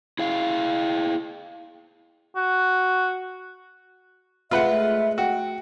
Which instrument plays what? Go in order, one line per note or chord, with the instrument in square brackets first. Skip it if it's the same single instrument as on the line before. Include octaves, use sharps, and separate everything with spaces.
[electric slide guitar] E4 G#4 F5
[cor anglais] F#4
[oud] G#3 A3 [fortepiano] F4 B4 F#5 [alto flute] E5
[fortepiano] F#4 [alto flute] G5